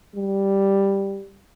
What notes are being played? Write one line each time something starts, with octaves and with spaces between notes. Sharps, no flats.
G3